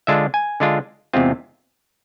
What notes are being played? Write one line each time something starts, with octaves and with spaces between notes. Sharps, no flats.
D3 G#3 D4 F4 E5
G#5
D3 G#3 D4 F4
E2 C3 G#3 C4 F4